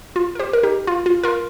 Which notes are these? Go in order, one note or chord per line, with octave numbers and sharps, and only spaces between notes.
F4
A#4
G4 C5
A#4
D#4 G4
F4
F4
F4 A#4